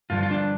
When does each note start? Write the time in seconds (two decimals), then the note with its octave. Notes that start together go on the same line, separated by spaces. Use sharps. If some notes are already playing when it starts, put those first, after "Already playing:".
0.10 G2 D3 F3 F4
0.23 F4
0.31 D4